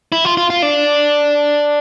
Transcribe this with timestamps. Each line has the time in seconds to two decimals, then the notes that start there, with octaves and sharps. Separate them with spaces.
0.12 E4
0.25 F4
0.37 F4
0.50 F4
0.62 D4